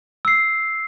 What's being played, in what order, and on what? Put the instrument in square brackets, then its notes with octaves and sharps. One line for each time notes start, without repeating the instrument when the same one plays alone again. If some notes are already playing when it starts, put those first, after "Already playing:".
[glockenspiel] E6 C7